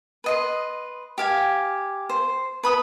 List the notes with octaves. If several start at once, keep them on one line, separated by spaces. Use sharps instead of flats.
B4 D#5 C6
G4 F5 G#5
C5
B4 B5 D#6